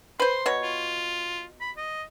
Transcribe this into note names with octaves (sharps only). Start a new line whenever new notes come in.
B4 C5 C6
B2 C#5
F4
B5
D#5